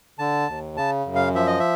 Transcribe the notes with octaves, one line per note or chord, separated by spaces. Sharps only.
D3 A5
D#2
C#3 A5
F#2
F5
F3 E5
D#5
E5